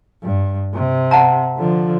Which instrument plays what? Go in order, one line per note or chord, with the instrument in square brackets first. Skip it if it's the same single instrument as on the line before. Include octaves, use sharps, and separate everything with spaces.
[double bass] G2
C3
[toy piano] F#5 A5 A#5
[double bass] D3 F3